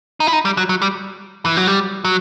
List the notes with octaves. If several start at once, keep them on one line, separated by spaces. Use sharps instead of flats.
D#4
E4
D#4
G3
F#3
F#3
G3
E3
F#3
G3
F#3